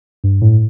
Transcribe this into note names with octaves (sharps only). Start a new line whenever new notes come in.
G2
A2